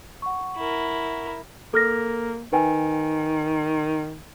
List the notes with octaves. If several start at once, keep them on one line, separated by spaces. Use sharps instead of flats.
F#5 C#6
E4 A#4
A#3 A4 F6 A#6
D#3 B4 G5 G#5